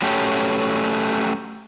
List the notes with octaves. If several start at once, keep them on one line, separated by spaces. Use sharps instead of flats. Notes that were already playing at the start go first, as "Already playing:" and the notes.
F#3 A3 C#4 G4